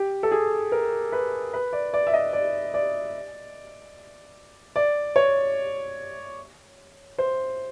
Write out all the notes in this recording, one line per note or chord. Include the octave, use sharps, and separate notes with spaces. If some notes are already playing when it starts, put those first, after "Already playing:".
Already playing: G4
A4
G#4
A#4
B4
B4
D5
D5
E5
D#5
D5
D5
D5
C#5
C5